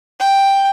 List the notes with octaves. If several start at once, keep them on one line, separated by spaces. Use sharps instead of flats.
G5